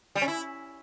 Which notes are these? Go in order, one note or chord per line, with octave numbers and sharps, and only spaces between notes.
G3
C#4
E4